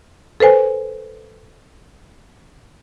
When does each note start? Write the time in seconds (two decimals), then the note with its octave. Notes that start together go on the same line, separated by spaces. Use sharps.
0.40 A4 B4 C5 G#5